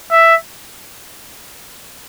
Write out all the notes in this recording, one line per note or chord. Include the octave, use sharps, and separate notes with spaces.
E5